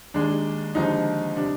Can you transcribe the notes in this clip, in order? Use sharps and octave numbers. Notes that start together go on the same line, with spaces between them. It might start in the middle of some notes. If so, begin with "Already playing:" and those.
D#2 D#3 G#3 D4
D#2 D3 F3 G#3 D#4
C3 G3 D4